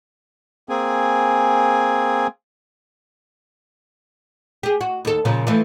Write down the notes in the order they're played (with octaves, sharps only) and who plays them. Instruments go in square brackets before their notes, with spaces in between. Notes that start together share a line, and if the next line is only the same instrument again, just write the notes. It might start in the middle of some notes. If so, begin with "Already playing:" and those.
[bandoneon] A#3 C4 G#4 G#5
[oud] G4 G#4
F#4
D#2 A4
A#2 C#3 F3
E3 F3 A3